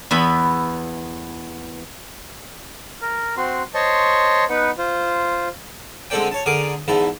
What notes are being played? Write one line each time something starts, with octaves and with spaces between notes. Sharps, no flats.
E2 B3 E5 B5
A#4
C4 F#4 C6
C5 C#5 D#5 A5 C6 C#6
B3 D#4 B4 F#5
F4 C5
D3 G#3 C4 A4 D5 G5
C#5 A5
D3 G#4 A#4 D5 D6 D#6
E2 G#2 E3 E4 A5